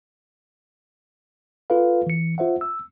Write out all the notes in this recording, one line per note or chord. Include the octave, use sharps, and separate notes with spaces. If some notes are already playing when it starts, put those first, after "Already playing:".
F4 A4 B4 F5
E3 C#7
F4 C5 E5 F#5
E6